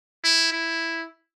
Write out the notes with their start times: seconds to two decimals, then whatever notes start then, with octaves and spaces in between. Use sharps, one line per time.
0.24 E4
0.53 E4